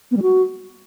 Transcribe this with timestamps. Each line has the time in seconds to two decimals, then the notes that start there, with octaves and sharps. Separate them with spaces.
0.11 B3
0.17 G3
0.22 F#4